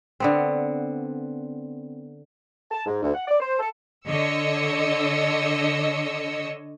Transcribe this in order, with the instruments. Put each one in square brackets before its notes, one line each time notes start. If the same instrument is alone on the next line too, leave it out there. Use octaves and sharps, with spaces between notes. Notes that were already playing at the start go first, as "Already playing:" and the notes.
[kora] D3 B3 C4
[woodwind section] A5
G#2
D2
F#5
D5
C5
A4
[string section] D3 C#5 D#5 E6 C#7